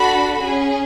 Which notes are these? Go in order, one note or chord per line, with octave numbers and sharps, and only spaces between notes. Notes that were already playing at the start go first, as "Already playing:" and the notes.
Already playing: D4 F#4 A4 B5
C#4 G#4